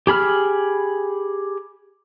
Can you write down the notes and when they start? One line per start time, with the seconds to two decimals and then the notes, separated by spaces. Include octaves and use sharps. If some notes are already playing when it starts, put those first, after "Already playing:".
0.07 G4 G#4 B5 F6